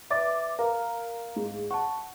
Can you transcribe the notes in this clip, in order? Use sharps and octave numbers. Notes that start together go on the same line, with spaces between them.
B4 D5 E5 D6 A6
A#4 F5
G#2
F#5 A5 C#6